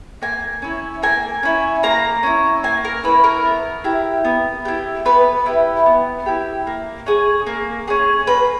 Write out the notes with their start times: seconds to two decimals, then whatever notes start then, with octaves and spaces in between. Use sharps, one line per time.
0.22 A#3 G#5
0.62 C#4 E4
1.03 A#3 G#5
1.43 C#4 E4
1.83 A#3 A#5
2.23 C#4 E4
2.63 A#3 G#5
2.85 A#4
3.04 C#4 E4 B4
3.24 A#4
3.45 B3
3.84 E4 G4
4.25 B3
4.65 E4 G4
5.05 B3 B4
5.46 E4 G4
5.86 B3
6.26 E4 G4
6.67 A#3
7.06 C#4 G#4
7.47 A#3
7.88 C#4 G#4
8.27 A#3 B4